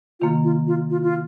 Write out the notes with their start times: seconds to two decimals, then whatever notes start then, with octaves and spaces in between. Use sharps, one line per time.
0.20 C3 D#3 A#3 F4
0.44 F4
0.67 F4
0.90 F4
1.03 F4